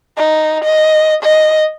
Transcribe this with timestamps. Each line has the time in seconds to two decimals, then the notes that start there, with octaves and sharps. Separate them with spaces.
0.17 D#4
0.65 D#5
1.22 D#5